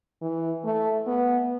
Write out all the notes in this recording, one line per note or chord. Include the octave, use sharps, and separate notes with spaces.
E3
A3
B3